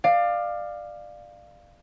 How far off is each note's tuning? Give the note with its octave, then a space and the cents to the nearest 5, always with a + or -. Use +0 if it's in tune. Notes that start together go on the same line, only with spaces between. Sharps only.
D5 +25 F5 +0